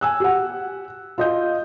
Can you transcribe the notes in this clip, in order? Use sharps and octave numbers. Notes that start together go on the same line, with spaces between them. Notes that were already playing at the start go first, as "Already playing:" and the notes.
G#5 E6 F#6
G4 F#5
F4 D#5 G6